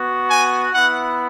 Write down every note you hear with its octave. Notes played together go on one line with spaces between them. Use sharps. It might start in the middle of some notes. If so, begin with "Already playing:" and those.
Already playing: B3 F#4
G#5
B3 E4 F#5